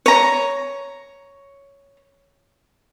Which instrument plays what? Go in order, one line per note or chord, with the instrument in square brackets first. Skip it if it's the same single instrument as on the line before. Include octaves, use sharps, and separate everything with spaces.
[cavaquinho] C#5 A#5